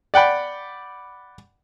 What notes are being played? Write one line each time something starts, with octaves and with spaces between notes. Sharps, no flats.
D5 F#5 G5 B5